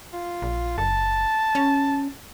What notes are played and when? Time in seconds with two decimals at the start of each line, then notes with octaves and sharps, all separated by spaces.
0.13 F4
0.42 A#1
0.78 F#1 A5
1.55 C#4